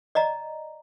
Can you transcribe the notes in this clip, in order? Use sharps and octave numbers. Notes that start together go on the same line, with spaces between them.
D5 D#5 A#5